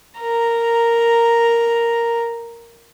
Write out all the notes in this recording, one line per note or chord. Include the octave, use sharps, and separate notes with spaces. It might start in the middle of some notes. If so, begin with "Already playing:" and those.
A#4 A#5